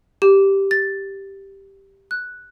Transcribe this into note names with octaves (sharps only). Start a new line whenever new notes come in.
G4
A6
F#6